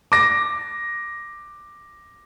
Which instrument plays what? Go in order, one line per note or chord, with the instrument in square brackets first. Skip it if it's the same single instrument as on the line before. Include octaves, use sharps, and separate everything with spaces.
[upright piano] D6 A#6